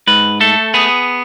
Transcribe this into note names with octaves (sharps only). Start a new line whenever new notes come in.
G#2 B4
A3 A4
B3 G#4